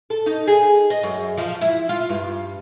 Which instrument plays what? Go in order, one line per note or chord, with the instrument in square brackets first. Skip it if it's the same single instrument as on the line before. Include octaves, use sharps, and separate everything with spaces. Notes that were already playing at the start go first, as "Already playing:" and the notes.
[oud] A4
D#4
G#4
D#5
F#2
F3
E4
F4
G2